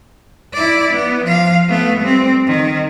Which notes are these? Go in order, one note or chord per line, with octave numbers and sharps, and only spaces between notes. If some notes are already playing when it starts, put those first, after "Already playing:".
E4 D5
B3
F3 F5
A3 B3
G3 C4
D#3